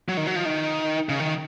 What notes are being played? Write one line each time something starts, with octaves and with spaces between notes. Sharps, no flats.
F#3
D#3
F#3
F3
D#3
C#3
D#3